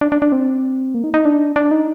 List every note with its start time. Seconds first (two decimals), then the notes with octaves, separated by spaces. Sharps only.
0.01 D4
0.12 D4
0.22 D4
0.32 C4
0.95 A#3
1.04 D#4
1.14 D#4
1.25 D4
1.56 D4
1.71 D#4